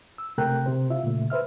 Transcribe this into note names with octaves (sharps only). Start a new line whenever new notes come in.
E6
C3 A3 A#4 G5 A#5 F#6
C3 C5
F4 E5
A#2 C#3 A3
B4 C5 E5 F6